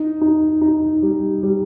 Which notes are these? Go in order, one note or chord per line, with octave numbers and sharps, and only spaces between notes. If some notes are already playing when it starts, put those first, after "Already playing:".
Already playing: D#4
D#4
D#4
G3
G3